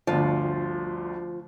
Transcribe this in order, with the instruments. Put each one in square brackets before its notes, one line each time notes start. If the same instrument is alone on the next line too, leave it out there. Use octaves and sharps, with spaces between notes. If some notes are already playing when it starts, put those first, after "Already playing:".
[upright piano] G1 D2 [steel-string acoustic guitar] F3